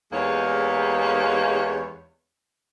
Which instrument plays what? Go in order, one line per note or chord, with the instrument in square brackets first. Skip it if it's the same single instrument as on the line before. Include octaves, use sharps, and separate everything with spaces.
[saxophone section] E2 G#3 A#3 D#4 G4 C#5